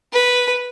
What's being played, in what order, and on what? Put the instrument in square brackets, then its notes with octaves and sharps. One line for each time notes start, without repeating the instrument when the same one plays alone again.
[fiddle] B4